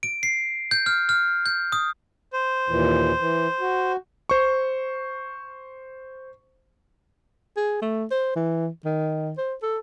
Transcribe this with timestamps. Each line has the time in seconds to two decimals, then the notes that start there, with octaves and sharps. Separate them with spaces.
0.03 D7
0.23 C7
0.71 G6
0.86 F6
1.09 F6
1.46 G6
1.72 D#6
2.33 C5
2.69 D#2 A#2 E3
3.20 E3
3.61 F#4
4.30 C5 C#6
7.57 G#4
7.82 A3
8.11 C5
8.36 E3
8.85 D#3
9.38 C5
9.62 A4